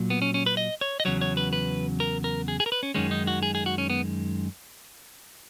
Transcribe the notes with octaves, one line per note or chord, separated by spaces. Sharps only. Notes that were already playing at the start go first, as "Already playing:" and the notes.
Already playing: A#2 F#3
B3
C#4
C#4
B4
D#5
C#5
D#5
E2 C#3 F#3 C#5
C#5
B4
B4
A#4
A#4
G#4
G#4
A#4
B4
C#4
F#2 D#3 G#3 C#4
D#4
F#4
G#4
G#4
F#4
C#4
B3